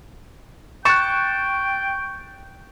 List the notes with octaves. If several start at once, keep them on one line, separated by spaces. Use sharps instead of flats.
G5 C#6 F#6 A6 C#7 E7